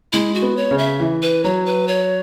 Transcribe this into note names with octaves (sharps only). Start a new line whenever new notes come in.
G#3 E4
F#4
B3
C#5
C#3
E5
E3
B4
F#3 C#5
B4
C#5